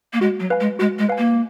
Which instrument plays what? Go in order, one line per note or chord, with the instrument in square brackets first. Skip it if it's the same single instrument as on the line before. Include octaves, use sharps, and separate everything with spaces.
[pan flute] A#3
[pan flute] G#3 [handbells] F#4
[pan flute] F#3
[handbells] B4 F5 G#5
[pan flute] G#3
[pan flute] G#3 [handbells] F#4
[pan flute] G#3
[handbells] B4 F5 G#5
[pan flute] A#3